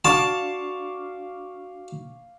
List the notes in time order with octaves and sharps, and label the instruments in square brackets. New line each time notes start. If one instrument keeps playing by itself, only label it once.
[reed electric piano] D4 F#4 [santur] F5 C#6 D6 [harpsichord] A5